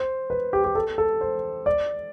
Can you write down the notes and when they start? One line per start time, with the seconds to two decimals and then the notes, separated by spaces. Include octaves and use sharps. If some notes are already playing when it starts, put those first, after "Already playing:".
Already playing: C5
0.30 B4
0.53 G4
0.64 G4
0.75 A4
0.98 A4
1.21 C5
1.66 D5